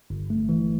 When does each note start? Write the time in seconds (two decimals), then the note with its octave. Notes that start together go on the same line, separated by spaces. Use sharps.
0.10 G1
0.30 A3
0.49 E3